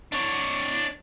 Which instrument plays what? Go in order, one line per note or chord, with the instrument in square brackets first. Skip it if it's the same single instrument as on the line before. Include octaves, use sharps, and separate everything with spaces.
[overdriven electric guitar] D4 C#5